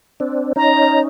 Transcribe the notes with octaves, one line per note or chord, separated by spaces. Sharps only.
C4 D4
C#4 D#4 A#5